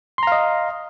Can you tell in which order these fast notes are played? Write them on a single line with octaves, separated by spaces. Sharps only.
C6 A#5 F5 D#5